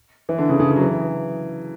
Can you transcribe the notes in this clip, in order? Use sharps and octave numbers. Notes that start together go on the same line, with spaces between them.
E3
D3
C#3
D3
C#3
C#3
F#3
E3